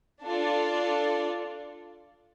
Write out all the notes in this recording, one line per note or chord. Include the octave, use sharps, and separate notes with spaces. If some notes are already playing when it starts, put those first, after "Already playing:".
D4 F4 A4 D5